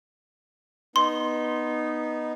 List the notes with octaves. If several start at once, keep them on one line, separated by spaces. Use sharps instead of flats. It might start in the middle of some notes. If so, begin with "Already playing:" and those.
B3 D#4 C6